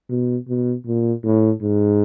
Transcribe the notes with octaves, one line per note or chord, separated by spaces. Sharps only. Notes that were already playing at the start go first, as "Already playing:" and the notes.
B2
B2
A#2
A2
G#2